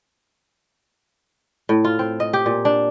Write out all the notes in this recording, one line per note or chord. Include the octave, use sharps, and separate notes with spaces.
A2
F4
C4
D#5
G4
A#2
D4